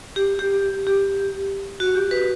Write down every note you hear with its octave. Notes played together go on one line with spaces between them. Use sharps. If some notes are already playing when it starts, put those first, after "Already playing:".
G4
G4
G4
F#4
G4
B4